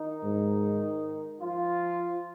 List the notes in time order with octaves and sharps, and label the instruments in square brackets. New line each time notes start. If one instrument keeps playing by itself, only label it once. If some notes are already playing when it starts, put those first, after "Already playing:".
Already playing: [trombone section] D#3 D#4
[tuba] G#2
[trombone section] F3 F4